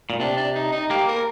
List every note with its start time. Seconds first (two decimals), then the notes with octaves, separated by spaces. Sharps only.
0.10 A#2
0.20 C3 D4
0.37 D4
0.55 D#4
0.72 D#4
0.90 A#3 G4
1.08 A#4